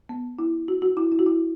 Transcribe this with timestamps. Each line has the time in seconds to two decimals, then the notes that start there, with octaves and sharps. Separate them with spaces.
0.09 B3
0.39 E4
0.68 F#4
0.82 F#4
0.97 E4
1.12 E4
1.19 F#4
1.26 E4